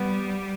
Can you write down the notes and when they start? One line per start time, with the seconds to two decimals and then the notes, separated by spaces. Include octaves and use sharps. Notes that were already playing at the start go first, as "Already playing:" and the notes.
Already playing: G3 B3